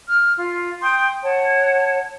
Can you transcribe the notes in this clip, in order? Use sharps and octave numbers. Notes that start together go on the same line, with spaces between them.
F6
F4
G5 C6 D#6 G6
C#5 F#5 A5